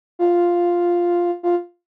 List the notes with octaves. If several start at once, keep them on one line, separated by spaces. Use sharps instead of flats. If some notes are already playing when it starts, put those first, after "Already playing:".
F4
F4